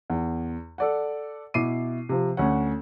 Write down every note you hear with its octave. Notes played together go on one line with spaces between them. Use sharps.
E2
A4 D5 F#5
B2 E4 D6 C7 D#7
C3 F3
D2 C#4 C#5 F#5